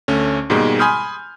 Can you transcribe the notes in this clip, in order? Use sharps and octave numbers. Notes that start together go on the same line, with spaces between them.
D2 A3 C#4
G#2 B2 D#3 G3 G#3 A#3
G#5 B5 C6 D#6 F6 G6